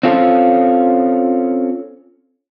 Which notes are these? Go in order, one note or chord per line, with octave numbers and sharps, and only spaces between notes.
C4 C#4 F4 A4